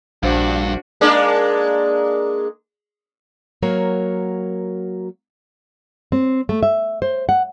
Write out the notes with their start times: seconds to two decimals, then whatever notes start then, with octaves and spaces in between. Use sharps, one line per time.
0.23 A#1 G2 D4 F#4 C5 F5
1.01 G#3 A#3 D4
3.62 F#3 A#3 F#4 A#4 C#5
6.12 C4
6.49 A3
6.63 E5
7.02 C5
7.29 F#5